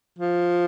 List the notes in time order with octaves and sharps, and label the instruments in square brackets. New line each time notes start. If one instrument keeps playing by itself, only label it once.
[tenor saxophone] F3